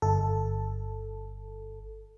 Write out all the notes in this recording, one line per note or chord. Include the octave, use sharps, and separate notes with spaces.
G1 A4